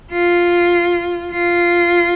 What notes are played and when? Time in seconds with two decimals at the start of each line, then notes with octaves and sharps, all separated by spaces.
0.11 F4
1.32 F4